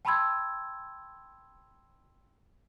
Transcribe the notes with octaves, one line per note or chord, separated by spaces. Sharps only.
G5 A5 B5 C6 E6 G#6